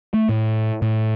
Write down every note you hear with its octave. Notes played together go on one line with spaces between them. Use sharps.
A3
A2
A2